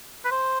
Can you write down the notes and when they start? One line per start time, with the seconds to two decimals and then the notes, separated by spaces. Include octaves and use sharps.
0.25 B4
0.31 C5